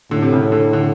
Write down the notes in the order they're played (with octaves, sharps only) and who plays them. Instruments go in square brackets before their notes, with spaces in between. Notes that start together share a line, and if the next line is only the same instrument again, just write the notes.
[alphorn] A2 [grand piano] D3
[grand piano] C3
C#3
D3
D3